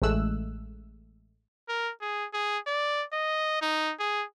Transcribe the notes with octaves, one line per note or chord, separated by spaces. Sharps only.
A1 G#3 A3 E6 F#6
A#4
G#4
G#4
D5
D#5
D#4
G#4